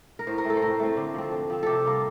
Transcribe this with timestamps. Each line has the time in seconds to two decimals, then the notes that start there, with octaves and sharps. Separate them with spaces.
0.19 A#4
0.27 A2 C5
0.38 A#4
0.44 A3 C4
0.50 A4
0.57 C5
0.62 A2 A#4
0.80 A3 C4
0.97 D3
1.14 F3 C4
1.32 D3
1.50 F3 C4
1.63 C3 G4 A4
1.85 G3 A#3